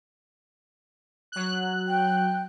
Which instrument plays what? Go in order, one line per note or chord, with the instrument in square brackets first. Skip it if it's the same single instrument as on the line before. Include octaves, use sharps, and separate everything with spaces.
[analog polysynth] F#3 F#6
[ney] G5